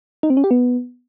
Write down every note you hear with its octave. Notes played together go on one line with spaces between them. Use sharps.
D#4
C4
C#4
G4
B3